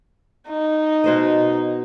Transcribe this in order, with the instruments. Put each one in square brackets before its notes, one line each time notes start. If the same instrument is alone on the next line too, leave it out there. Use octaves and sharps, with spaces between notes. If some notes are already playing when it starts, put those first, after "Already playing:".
[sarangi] D#4
[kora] B2 C5 D#5